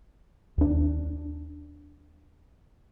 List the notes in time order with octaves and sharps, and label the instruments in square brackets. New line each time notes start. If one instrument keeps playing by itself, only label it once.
[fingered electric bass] D#2 D4